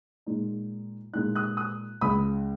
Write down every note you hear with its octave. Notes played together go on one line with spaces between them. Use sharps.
A#2 G#3 D#4
A#2 G#3 D#4 F#6
D#6 F#6
D#6 F#6
C#2 C#3 G#3 B5 D#6